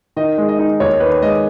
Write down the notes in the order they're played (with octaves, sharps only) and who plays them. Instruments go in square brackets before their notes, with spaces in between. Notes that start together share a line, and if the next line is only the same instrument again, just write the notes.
[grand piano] D#3 [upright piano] D#5
[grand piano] G#3
[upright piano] D#5
[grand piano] D#4
[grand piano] D#2 [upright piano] C#5
[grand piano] D#3 [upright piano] B4
[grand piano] G#3 [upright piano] D#5